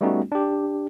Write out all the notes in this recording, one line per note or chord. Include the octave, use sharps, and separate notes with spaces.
G3 A3 B3 C#4 D#4 F#4
D4 G4